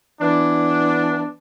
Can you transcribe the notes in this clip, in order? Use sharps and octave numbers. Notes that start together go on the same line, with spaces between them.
E3 B3 D4